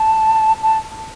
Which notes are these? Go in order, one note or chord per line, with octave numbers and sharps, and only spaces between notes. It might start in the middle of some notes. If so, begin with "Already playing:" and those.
Already playing: A5
A5